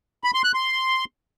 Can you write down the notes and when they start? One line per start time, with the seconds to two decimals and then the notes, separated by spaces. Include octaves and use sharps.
0.24 B5
0.34 C6
0.44 F#6
0.54 C6